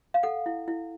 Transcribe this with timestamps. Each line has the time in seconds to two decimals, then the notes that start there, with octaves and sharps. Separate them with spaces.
0.14 F5
0.23 A4 F#5
0.46 E4
0.68 E4